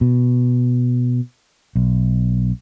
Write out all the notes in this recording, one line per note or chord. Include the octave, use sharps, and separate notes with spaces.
B2
B1